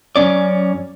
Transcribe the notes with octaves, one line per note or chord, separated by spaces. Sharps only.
F#2 C#3 C#4 D5